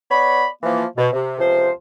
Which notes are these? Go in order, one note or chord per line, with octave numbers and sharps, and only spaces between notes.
B3 C#5 D5 B5
E3 F3 A#3
B2
C3
C#2 C3 F3 C5